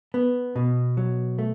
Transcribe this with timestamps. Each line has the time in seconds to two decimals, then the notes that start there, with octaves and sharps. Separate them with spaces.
0.14 B3
0.56 B2
0.97 F#3
1.38 A3